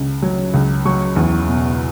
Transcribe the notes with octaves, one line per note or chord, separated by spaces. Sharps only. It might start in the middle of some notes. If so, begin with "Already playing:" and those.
Already playing: C#2 C#3
F#3
C#2
F#3 C#6
E2
B2